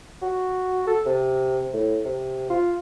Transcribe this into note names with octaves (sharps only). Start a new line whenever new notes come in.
F#4
A4
C3
A2
C3
F4